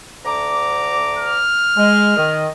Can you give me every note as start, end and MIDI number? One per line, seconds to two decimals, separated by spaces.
0.24 1.42 38
0.24 1.42 82
0.24 1.42 86
1.18 2.41 89
1.77 2.13 56
2.16 2.46 51
2.16 2.46 75